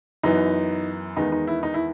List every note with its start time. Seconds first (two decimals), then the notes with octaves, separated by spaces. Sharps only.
0.23 F#2 E3 B3 D#4
1.17 E2 D#3 G#3 B3 D#4
1.32 D#4
1.47 E4
1.63 D#4
1.74 E4